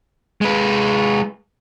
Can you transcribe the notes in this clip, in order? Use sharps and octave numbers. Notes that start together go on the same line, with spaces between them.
G#3 B4